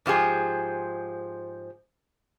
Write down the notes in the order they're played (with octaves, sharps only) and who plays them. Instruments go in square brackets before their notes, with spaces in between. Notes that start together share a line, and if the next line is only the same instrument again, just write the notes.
[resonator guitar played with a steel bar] G#2 F3 G4 G#4